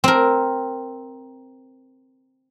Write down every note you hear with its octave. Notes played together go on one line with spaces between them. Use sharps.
C4 A#4